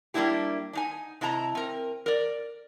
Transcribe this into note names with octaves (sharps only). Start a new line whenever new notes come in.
G3 A#3 C#4 D4 E4 G4
D4 D#4 G#5
C3 E4 D#5 A5 A#5
C4 A#4
A#4 D5